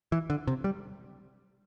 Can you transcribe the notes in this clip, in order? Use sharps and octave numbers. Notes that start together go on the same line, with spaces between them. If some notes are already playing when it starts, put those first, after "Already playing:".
E3
D3
C3
G3